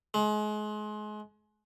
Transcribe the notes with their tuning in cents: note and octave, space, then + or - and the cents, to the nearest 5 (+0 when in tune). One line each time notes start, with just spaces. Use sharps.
G#3 +30